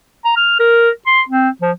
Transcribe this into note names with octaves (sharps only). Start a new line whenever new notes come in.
A#5
F6
A#4
C6
C4
F3